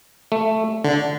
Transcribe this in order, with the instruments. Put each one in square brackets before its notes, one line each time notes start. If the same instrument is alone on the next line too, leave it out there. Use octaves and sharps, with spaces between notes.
[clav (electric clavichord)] A3
[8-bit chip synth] D3